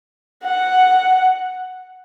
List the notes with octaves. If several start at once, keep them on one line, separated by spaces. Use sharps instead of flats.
F#5